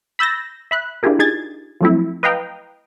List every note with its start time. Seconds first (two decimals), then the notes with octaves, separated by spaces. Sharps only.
0.19 B5 E6 G6 A6 A#6
0.71 E5 B5 F#6
1.03 D4 E4 F4 G4 G#4 A#4
1.19 D#4 G#4 G#6 A6
1.81 F3 F#3 A3 C4 E4
2.23 B4 D#5 F5 G5 A#5